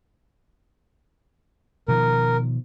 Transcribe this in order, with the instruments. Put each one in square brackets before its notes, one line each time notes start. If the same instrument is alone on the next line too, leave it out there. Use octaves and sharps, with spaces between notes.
[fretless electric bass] B2 D#3 F3 [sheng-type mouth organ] A#4